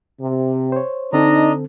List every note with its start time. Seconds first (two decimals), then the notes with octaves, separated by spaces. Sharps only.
0.21 C3
0.72 C5 C#5
1.13 D3 C4 D4 D#4 A4 D#5 A#5